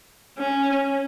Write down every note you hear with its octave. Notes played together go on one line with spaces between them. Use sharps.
C#4